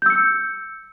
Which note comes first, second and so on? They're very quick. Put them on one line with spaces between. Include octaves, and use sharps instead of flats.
G6 E6 C#7